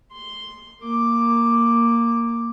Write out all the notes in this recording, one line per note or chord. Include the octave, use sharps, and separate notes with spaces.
C6
A#3 D6